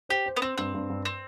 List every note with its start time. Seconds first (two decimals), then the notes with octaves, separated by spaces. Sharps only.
0.09 G4 C5
0.26 C5
0.36 B3
0.42 C4 C5
0.58 G2 C4
0.74 G2
0.90 G2
1.05 C4